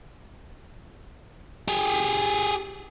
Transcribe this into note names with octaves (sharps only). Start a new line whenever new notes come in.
G4 G#4